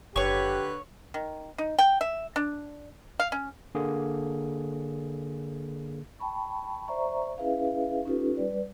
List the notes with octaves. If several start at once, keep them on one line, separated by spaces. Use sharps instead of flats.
F#1 D3 G4 B4 C#5 C#6
D#3
D#4
G5
E5
D4
F5
C#4
D3 A#3 G#4
G5 A5 B5 C#6
C5 D5 E5 A#5 C#6
C#4 E4 G#4 B4 E5 F5
C#4 D#4 F4 G4 A4 B4
G3 B4 D5